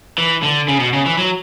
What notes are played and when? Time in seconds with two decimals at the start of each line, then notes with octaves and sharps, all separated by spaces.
0.18 E3
0.43 D3
0.68 C#3
0.80 B2
0.93 C#3
1.06 E3
1.18 F#3